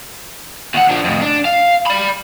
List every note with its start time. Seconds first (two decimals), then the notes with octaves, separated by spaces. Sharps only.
0.74 D#2 F#5
0.89 F3 D4
1.04 F2 A2
1.22 D4
1.45 F5
1.86 D5 B5